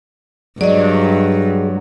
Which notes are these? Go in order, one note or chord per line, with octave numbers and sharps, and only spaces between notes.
G2 F#3 G#3 D5 D#5